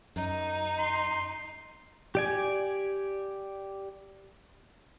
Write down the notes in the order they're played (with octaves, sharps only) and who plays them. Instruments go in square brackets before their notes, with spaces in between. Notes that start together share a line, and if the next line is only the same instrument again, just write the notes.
[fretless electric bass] F#2 [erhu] D#4
[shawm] C6
[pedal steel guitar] G4 D5 G#5